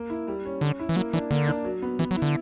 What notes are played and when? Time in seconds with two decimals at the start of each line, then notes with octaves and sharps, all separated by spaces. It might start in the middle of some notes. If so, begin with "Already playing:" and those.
Already playing: A#3
0.10 E4
0.27 G3
0.45 C#4
0.61 D3 C#4
0.79 E4
0.89 E3
0.96 F#3 A#3
1.13 E3 D4
1.31 D3 A#3
1.48 D4
1.64 F#3
1.82 B3
1.99 E3 B3
2.11 F#3
2.16 E4
2.22 D3